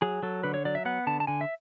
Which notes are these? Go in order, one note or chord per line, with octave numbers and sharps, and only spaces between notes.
F#3 G#4
F#3 A4
D3 B4
C#5
F#3 D5
E5
B3 F#5
D3 A5
A5
D3 G#5
E5